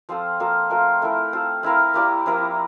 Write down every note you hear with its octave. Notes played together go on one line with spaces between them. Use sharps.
F3 C4 F4 A4
A#3 F4 A4
A3 C4 F4 A#4
A3 E4 A#4
C4 F4 A4
C4 E4 A#4 F5
A#3 E4 G4 D5
F3 C4 E4 A#4